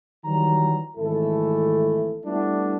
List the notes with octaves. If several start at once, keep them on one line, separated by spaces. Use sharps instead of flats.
D#3 E3 F#3 G3 A#5
G#1 E3 A3 E4 A4
G3 A3 B3 D4 E4